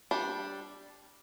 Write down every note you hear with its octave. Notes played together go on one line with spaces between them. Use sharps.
G3 D4